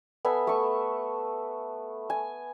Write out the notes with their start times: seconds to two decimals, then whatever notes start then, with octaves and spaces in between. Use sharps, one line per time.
0.25 B3 A4 E5 G#5
0.47 A3 C#6
2.10 G#5